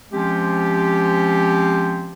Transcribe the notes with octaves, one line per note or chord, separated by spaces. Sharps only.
F3 G#3 C4 C#4 G4